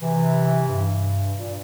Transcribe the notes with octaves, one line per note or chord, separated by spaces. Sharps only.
C3 E3
G2
A#2